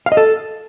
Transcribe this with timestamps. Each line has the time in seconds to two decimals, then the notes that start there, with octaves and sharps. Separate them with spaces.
0.06 F5
0.12 D#5
0.17 A4